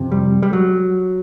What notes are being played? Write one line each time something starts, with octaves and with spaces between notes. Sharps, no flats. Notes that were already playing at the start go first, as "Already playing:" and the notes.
Already playing: F2 C3
G3
G3
F#3